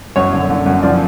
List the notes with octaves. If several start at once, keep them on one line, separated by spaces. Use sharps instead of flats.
F#2 C#5
D3
D3
F#2
F3 D5